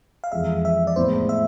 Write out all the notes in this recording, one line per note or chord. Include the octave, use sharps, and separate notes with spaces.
F5
F2 E3 G#3 E5
E5
D5
A2 G#3 B3 E4 C5
E5